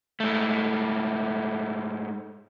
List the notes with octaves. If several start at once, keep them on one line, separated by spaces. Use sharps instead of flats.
G#2 A3